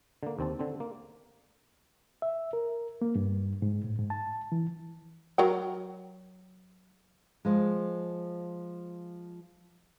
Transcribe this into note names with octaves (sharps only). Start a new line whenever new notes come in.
D3 A#3
D#2 C4 A5
D3 C4
A#3
E5
A#4
A#3
G2
G#2
A2
G#2
A5
E3
F#3 A#4 G5
F3 G#3